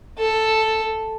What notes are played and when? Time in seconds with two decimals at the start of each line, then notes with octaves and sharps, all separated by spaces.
0.19 A4